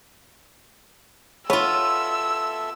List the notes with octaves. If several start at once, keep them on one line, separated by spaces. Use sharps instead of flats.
B3 F4 A4 C#5 E5 E6